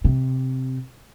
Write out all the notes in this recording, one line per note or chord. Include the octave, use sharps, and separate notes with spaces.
C3